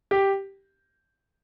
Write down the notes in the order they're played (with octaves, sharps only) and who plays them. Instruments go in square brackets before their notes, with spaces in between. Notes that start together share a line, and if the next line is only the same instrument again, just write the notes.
[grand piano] G4